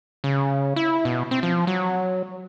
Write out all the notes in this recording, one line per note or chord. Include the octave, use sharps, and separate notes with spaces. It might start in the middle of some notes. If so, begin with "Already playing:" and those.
C#3
E4
B2
C4
F3
F#3